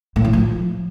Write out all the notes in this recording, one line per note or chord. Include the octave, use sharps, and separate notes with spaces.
A2
E3
F3